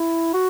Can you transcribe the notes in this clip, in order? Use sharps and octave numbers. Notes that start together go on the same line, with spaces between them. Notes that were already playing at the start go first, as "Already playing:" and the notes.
Already playing: E4
F#4